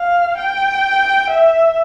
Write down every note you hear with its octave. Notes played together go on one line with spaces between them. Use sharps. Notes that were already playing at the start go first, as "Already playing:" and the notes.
Already playing: F5
G5
E5